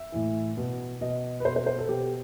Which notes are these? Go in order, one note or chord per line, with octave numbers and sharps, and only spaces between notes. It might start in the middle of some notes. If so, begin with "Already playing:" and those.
Already playing: E5
A2 E3
B2
B2 D#5
B4
B2 C5
C5
C5
A4
B2 G4